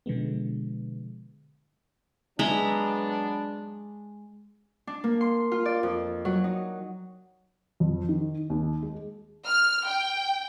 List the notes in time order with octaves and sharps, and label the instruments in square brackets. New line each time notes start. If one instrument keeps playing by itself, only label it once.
[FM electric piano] B2 D3 F3 G#3 B3
[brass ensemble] F#3 B3 D4 [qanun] G#3 E5 A#5
[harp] D4
A#3
C6
F4
D5
F2
F#3
D#4
[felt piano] F2
D#3
D#2
G#3
[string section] F6
G5